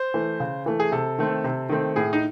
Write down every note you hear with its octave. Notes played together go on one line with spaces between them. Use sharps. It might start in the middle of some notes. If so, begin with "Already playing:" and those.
Already playing: C5
E3 A3
C#3
E3 A3
G#4
C3 A4
D#3 A3 C4
C3
D#3 A3 C4
A2 G#4
D#4